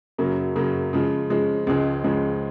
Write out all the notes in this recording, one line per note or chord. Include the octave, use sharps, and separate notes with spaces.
F#2 C#3 F#3 A#3
F#2 C#3 F#3 A#3
C#3 F3 G#3
C#3 F3 G#3
C#2 C#3 F3 G#3
C#2 C#3 F3 G#3